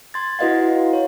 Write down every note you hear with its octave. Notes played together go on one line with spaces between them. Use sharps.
C6 G#6 A6
E4 F#4 B4 D#5 F5 F#5
C#5